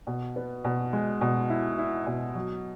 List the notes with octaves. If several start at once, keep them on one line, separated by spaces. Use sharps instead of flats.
B2
B3
B2
G#3
B2
E4
E4
B2
F#3